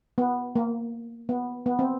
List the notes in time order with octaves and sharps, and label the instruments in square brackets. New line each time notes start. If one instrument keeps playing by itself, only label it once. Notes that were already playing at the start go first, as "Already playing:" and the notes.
[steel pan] B3
A#3
B3
B3
C4